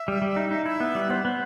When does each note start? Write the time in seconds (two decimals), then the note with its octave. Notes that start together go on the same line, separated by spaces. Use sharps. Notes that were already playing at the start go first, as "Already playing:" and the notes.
Already playing: E5
0.08 G3
0.22 G3
0.36 D#4
0.51 D#4
0.66 E4 E5
0.80 B3
0.95 G3
1.10 B3 C5
1.25 B3